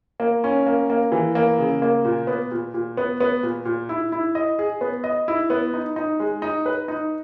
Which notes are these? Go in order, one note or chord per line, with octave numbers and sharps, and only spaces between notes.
A#3
C#4
A#3
A#3
E3
A#3
C#3
A#3
A#2
B3
A#2
A#2
B3
B3
A#2
A#2
E4
E4
D#5
G#4
B3
D#5
E4
B3
D#4
D#4
G#3
D#4
B4
D#4